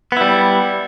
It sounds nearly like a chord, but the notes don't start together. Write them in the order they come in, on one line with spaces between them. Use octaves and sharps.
B3 E4 G3